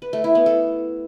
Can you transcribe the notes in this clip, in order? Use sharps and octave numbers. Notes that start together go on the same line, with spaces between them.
B4
A3
E4
B3
A4